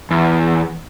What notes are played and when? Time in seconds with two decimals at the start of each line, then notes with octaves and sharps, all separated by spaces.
0.11 E2